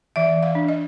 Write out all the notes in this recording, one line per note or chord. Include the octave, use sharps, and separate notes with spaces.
E3 E5
E3
F5
D4
D#5